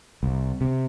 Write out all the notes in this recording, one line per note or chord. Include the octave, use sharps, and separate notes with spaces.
C2
C3